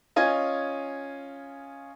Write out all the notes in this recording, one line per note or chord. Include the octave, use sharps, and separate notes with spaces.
C#4 F4 D#5 F5 G#5 G#6